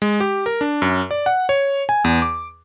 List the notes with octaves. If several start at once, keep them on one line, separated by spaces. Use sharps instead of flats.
G#3
G4
A#4
D4
F#2
D5
F#5
C#5
G#5
E2
D6